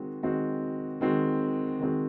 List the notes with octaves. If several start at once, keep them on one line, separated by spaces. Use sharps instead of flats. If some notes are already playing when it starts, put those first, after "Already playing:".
Already playing: D#3 G#3 C4 F#4
D#3 G#3 C4 F#4
D#3 G#3 C4 F#4
D#3 G#3 C4 F#4